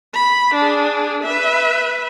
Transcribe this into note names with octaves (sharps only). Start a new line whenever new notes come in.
B5
D4 G#4
B4 E5